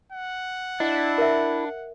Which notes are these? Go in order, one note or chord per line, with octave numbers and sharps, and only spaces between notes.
F#5
D4 E4 D#5
A#4 E5